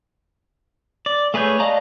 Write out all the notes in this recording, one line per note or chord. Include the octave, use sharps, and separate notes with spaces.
D5
A3 G#4 B4 C#5 G6
D5 D#5 F5 A5 A#5